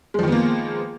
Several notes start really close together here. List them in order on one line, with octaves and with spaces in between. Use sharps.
G#3 F3 D#3 B3 A#3